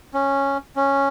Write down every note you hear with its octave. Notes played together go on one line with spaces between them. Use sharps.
C#4
C#4